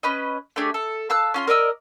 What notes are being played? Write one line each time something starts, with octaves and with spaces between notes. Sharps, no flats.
C#4 B4 D#5
A3 D4 G4 G#4
A4
F5 A5 E6 F#6
C#4 F4 C6
A#4 D5 D#5 E6